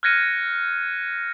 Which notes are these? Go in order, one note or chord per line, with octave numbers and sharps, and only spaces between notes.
F6 F#6 G#6 A#6 C#7 D#7